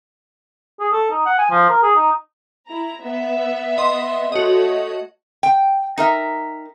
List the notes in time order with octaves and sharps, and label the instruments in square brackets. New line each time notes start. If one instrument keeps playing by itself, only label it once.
[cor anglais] G#4
A4
D#4
F#5
G#5
F3
A#4
G#4
D#4
[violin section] E4 A#5
B3 E5
[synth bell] D#5 C6
[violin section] A3 C#5 [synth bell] F#4 D#5
[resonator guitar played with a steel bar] G5
D#4 A#4 E5